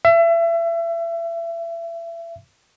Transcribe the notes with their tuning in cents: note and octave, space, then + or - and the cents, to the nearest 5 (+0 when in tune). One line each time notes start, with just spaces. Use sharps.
E5 +30